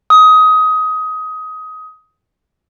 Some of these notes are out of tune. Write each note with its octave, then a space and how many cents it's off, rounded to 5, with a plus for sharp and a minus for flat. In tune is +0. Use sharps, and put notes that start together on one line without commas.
D#6 +20